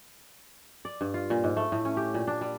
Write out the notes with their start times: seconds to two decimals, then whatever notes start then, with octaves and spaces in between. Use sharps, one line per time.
0.85 D5
1.01 G2
1.14 F4
1.30 A#2
1.44 G#2
1.57 A3
1.72 A2
1.85 C#4
1.97 G4
2.14 A#2
2.28 D4
2.41 G3